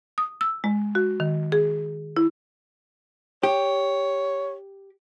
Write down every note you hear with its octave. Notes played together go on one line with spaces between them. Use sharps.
D#6
E6
G#3
F#4
D#3
G#4
E4
G4 C#5